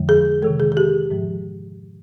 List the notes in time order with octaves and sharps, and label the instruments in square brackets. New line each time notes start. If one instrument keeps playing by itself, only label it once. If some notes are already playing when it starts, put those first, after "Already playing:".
Already playing: [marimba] F2 D3 F3 G#3
G#4
C3 D#3 G#3 A4
G#4
G#4
G4
G#2 F3 G#3